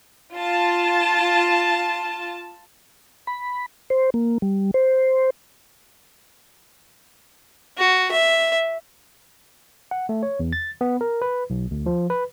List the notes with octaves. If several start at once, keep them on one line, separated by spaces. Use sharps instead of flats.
F4 A5
B5
C5
A#3
G3
C5
F#4
E5
F#5
A3
C#5
E2
A6
B3
A#4
B4
B1
D2
F3
B4